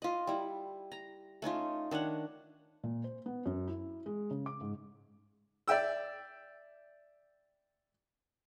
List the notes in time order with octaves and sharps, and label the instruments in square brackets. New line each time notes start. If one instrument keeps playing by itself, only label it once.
[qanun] F4 D#5
G3 E4
A#5
A3 C#4 D#4 F4
D#3 D4 C#5 F#5
[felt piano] A#2
C5
B3
F#2
E4
G#3
C#3
D6
G#2
[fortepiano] D5 E5 G5 E6